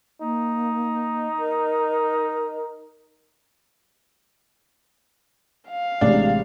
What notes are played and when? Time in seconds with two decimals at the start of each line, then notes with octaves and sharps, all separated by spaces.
0.22 A#3 D#4
1.39 A#4
5.69 F5
6.01 A1 C3 G#3 D4